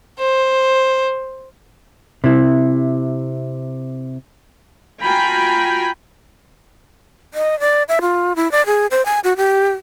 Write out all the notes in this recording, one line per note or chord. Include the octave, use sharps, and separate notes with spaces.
C5
C3 E4
F4 F#4 G5 G#5 A#5 B5
D#5
D5
E5
F4
E4
D5
G#4
C5
G#5
F#4
G4